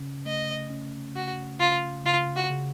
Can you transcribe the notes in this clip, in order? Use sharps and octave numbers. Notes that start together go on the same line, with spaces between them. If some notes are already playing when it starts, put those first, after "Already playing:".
Already playing: C#3 C#4
A3 D#5
C#4
C#3 F#4
C#3 F4
C#3 F4
F#4
C#3